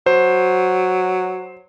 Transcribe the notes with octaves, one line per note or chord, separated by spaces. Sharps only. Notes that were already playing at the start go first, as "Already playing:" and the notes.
F#3 C5